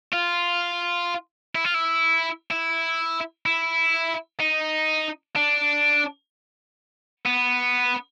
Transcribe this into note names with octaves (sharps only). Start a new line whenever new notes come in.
F4
E4
F4
E4
E4
E4
D#4
D4
B3